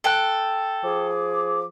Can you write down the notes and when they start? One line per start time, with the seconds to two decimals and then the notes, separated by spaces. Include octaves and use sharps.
0.04 A4 G5 F#6
0.83 F3 G#4 D6